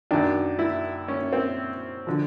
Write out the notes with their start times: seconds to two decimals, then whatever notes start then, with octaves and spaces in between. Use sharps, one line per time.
0.11 F#2 D#3 D4
0.59 E4
1.08 C#4
1.33 C4
2.07 D3 F3